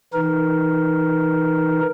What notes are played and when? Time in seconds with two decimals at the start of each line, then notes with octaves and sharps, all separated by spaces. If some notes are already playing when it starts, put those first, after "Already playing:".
0.14 E3 D#4 A#4